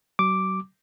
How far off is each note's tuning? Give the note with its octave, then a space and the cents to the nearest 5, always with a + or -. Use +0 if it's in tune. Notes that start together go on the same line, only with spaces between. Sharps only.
F#3 +35 D6 +0